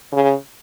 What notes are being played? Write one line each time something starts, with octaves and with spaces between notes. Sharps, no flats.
C#3